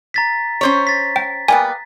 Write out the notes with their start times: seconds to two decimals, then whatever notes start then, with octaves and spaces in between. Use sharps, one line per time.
0.14 A#5 A6 B6
0.61 C#4 C5 C#5
0.87 A6 B6
1.16 G5
1.48 G3 A#3 B3 G#5